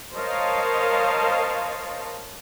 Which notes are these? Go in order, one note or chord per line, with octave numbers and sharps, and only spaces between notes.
A#4 C5 C#5 D#5 F5 A5